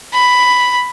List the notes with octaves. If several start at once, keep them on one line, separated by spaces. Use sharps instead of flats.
B5